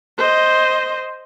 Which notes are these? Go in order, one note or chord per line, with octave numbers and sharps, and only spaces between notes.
C5 D#5